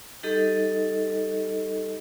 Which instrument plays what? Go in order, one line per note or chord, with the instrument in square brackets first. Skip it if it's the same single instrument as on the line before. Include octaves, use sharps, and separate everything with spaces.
[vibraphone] G3 D#4 G4 A4 D#5